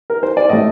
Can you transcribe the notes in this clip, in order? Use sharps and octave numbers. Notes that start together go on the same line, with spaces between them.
A#4
C5
D5
A2 A3 D#5